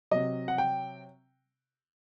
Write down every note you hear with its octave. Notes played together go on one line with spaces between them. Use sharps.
C3 F#3 D#5
F#5
G5